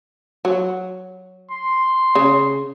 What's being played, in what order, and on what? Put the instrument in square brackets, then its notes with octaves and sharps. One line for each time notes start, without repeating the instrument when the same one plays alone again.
[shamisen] F#3
[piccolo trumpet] C6
[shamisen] C#3